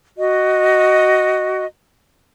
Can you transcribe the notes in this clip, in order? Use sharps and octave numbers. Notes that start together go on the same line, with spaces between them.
F#4 D#5